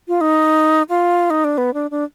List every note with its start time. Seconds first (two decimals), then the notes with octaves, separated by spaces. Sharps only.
0.08 F4
0.21 D#4
0.89 F4
1.30 D#4
1.44 D4
1.58 B3
1.74 D4
1.91 D4